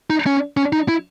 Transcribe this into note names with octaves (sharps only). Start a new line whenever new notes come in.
D#4
C#4
C#4
D#4
E4